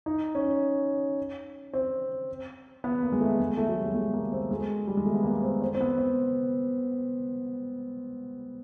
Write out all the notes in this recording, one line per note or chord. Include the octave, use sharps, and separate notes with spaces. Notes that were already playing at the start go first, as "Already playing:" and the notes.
D#4
C#4
C4
B3
A#3
G#3
A3
G#3
A3
F#3
G3
G#3
A3
A#3
C4
G#3
G3
G#3
A3
B3
A#3
C4
C4
C4
B3
C4